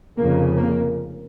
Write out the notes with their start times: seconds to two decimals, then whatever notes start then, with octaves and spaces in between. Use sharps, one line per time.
0.17 F1 F2 C#3 A#3
0.57 A#3